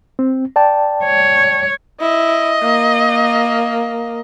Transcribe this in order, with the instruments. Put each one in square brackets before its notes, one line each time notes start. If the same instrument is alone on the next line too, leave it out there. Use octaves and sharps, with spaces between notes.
[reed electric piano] C4
D5 G5 A5
[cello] C#5
[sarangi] E4 [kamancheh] D#5
[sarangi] A#3